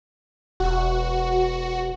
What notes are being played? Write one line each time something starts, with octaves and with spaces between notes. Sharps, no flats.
E1 F#4